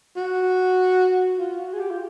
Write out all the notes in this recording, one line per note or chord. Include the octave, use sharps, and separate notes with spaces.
F#4
F4
F#4
G#4
G4
F4